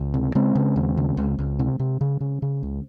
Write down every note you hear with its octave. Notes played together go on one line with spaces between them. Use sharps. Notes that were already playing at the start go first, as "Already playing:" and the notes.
Already playing: C#2
C3
C#3 G#3 C4
C#3
D#2
C#3
C#2
C#2
C3
C3
C#3
C#3
C#3
C#2